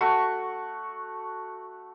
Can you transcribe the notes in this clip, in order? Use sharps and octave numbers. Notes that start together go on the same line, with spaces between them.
A3 F#4 C#6